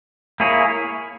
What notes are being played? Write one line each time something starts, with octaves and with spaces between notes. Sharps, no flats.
A#3 E4 G#4 C#5